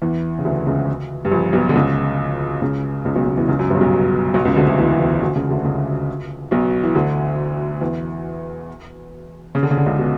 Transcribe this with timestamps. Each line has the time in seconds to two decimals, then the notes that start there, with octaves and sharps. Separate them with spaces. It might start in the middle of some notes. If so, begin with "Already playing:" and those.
0.02 E2 E3
0.39 C#3
0.45 D2 D3
0.66 C#2 C#3
1.25 G2
1.32 A#1 A#2
1.53 B1 B2
1.69 D3
1.75 C#2 C#3
2.62 C#2 C#3
3.05 C#2 C#3
3.15 B1 B2
3.27 C#2 C#3
3.37 E2 E3
3.48 C#2 C#3
3.59 F#2
3.70 G1 G2
3.75 C#3
3.81 B1 B2
4.34 B1 B2
4.45 C#2 C#3
4.56 D2 D3
4.67 D2 D3
4.78 E2 E3
4.99 E2 E3
5.22 D2 D3
5.35 C#2 C#3
5.50 D2 D3
5.64 C#2 C#3
6.51 B1 B2
6.83 E3
6.95 D2 D3
7.81 E2 E3
9.55 C#3
9.63 D3
9.71 C#3
9.78 D3
9.86 C#2 C#3
9.99 B2